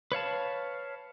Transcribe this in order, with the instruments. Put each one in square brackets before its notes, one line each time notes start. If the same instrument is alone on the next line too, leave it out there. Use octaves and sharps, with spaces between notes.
[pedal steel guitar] B4 C#5 F5 A5